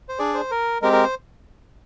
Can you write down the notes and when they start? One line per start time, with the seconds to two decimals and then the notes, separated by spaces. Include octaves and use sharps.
0.09 C5
0.19 D4 G#4 D5
0.34 C5
0.51 A#4
0.82 G#3 C4 G4 A#4
0.93 A#4
1.04 C5